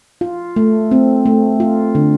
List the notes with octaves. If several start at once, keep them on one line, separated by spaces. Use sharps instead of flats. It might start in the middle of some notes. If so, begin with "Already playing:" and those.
F4
A3
C4
A3
F4
D3